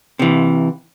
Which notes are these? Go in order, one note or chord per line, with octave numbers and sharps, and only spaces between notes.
C3 E3